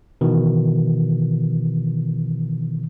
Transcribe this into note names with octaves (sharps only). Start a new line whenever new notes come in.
B2 D#3 E3